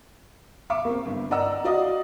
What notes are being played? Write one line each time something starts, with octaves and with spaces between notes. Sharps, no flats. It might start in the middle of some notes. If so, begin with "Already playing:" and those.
E5 F5 C#6 D6
A#3 C4
G1
D5 D#5 F#5 A#5 E6
F#4 D5 D#5 F5 D#6